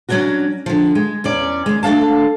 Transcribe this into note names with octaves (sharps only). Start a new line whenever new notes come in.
F#3 A3 C#4 D4 F#4
D3 F3
G#3
E2 C#4 D5
D#2 G#3
A3 D4 A4 F5 A5